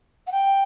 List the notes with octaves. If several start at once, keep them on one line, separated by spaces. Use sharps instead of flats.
F#5
G5